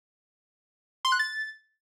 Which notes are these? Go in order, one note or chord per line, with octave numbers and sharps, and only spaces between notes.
C6
F#6
A6